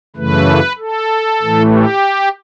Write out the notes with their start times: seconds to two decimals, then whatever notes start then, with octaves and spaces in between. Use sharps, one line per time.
0.16 F#2 C#3 E3 A3 B4
0.79 A4
1.42 A2 E3 A3
1.73 G4